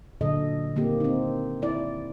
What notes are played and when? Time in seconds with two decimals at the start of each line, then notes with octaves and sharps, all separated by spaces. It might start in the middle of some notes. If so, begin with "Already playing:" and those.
0.21 A#2 D3 F#3 A4 D#5
0.76 D#3 A#3 C4 G4
1.00 C4 D#4
1.62 E4 D5